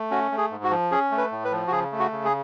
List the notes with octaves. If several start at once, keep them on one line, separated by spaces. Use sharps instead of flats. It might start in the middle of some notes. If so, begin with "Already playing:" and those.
Already playing: A3
C#4 F#4
A3
G#4
G#2
F#4
F3
C#4 G#4
A3
B4
A2
B4
F3
F#4
C#3 G#4
A3
F#4
C#3
G#4